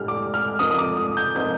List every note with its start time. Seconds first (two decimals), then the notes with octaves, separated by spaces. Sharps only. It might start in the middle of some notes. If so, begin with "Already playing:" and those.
Already playing: A2 G3 D4 G4 F6
0.08 D6
0.34 F6
0.59 F3 C4 D#4 A#4 D#6
0.71 D#6
0.78 D6
0.97 D#6
1.17 G6
1.35 F3 C4 D#4 A#4 G6